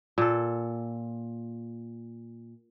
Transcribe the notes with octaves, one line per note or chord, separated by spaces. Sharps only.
A#2 A4